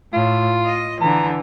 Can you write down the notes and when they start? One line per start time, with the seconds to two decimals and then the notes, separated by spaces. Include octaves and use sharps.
0.13 A2 F4
0.65 D#5
1.01 D3 E3 A#5